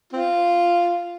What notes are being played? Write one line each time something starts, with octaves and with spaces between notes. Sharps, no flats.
C4 F4